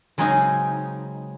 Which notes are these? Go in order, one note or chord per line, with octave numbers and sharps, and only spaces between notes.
C#3 F#3 G#3 C4 C#4 D#4